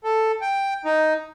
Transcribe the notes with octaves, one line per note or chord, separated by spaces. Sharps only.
A4
G5
D#4